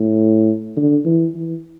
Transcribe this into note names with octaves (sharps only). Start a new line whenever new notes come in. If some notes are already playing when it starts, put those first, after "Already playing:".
Already playing: A2
D3
E3
E3